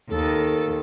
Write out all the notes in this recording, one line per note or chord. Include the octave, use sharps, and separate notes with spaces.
D#2 A4